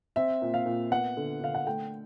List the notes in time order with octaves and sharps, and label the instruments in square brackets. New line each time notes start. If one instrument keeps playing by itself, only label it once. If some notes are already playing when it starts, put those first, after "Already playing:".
[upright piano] C4 E5
A#2
F5
A#2
B3 F#5
D3
D3 F5
F#5
A3 G5